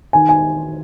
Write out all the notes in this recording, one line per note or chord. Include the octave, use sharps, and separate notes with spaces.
D#3 G#5
G#5